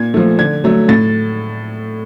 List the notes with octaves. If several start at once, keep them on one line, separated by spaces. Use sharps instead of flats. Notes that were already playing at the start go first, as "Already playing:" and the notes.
Already playing: A#2 G#6
F3 A3
D3 G#6
F#3 A3
A2 A6